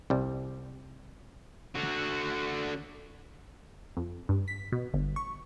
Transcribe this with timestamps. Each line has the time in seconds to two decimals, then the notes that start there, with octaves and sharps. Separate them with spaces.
0.10 C2 G3
1.75 D3 F#4
3.97 F2
4.29 G2
4.48 B6
4.72 B2
4.94 G1
5.16 C#6